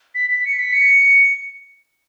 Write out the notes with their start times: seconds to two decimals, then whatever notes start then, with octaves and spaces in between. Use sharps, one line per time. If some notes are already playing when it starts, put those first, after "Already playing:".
0.15 B6
0.30 B6
0.45 C#7
0.59 B6
0.73 C#7